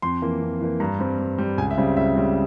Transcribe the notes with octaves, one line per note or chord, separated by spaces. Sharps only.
F2 C6
E3 A#3
F2
E3 A#3
G2 A#5
G3 C4
G2
G3 C4
C#2 G#5
E5
C#3 G3 C4
C#2 E5
C#3 G3 C4